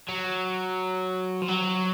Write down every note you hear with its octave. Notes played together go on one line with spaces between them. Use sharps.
F#3
F3
F#3